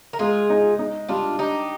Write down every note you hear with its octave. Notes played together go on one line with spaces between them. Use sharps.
A#4
G#3 F4 G#4
D#4
D#4
G3 D4 F4
D4 D#4 G4